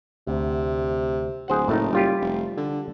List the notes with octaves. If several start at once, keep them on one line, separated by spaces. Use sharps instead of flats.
D2 C3
D1 G#4 C5 F#5
F#1 A2 A3 D#4
G3 F4 G4
F1
D3